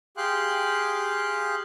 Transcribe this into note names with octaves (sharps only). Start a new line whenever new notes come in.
G4 G#4 F5 G5 C6 F#6